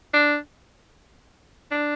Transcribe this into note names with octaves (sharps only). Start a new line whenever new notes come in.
D4
D4